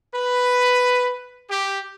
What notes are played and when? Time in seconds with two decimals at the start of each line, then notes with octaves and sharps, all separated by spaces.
0.14 B4
1.50 G4